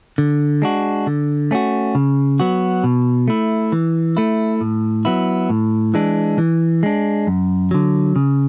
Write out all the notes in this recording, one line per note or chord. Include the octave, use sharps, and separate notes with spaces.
D3
G#3 D4 F#4
D3
A3 C#4 F#4
C#3
F#3 B3 F#4
B2
A3 E4
E3
A3 E4
A2
F#3 B3 E4
A2
E3 G#3 D4
E3
G#3 D4
F#2
D3 F#3
C#3